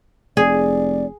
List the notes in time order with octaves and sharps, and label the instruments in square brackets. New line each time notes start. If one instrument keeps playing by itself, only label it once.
[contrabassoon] F1 [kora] G#4 [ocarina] D5